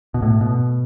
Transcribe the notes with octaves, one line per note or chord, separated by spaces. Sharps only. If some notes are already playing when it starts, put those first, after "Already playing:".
B2
A2
B2